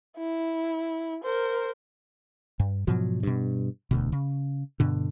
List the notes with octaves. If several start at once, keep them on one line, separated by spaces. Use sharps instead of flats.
E4
A#4 C5
G2
G#2 B2 F3 F#3
G2 B2
E1 D2 B2
C#3
G2 B2 D3